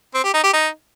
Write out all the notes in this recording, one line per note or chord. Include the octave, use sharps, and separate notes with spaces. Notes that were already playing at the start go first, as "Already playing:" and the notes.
C4
G4
D#4
G4
D#4